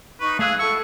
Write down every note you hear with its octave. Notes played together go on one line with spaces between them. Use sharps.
D#4 B4 C#6
A3 G#4 E5 F5 E6 F#6 G#6
E4 F#4 A4 C#6 E6